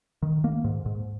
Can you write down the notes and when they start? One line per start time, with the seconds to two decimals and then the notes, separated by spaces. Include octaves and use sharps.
0.23 D#3
0.44 A#3
0.64 G#2
0.86 G#2